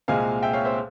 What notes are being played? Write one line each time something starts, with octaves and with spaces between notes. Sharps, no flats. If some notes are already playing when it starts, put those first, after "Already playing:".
C2 A#2 G#3 C4 F5 G#5
E5 G5
C#5 F5
C5 E5